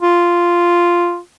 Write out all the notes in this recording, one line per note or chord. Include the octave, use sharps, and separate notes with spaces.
F4